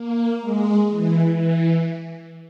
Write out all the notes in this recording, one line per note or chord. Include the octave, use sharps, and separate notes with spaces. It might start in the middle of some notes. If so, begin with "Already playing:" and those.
Already playing: A#3
G#3
E3
E3